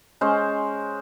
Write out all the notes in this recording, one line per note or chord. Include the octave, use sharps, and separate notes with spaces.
G#3 C#4 C5